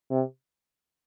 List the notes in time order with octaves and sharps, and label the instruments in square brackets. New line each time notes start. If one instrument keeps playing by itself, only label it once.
[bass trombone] C3